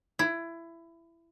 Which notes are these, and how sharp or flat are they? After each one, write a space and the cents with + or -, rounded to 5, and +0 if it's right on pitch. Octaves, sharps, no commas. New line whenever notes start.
E4 +20